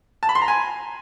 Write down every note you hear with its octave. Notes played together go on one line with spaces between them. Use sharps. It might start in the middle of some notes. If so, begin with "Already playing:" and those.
A5
B5
C6
A#5
G#5